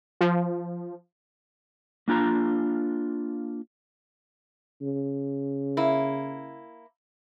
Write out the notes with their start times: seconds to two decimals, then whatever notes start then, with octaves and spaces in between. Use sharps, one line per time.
0.21 F3
2.08 A#3 D4 F4 A#5
4.82 C#3
5.77 A#3 E4